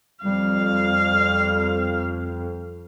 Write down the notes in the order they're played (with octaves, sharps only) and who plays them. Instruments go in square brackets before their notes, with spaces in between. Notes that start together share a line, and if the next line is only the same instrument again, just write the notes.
[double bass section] F2 [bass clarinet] G3 [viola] F5